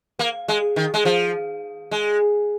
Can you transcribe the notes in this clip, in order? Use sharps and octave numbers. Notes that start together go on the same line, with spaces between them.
A#3
G#3
D#3
G#3
F3
G#3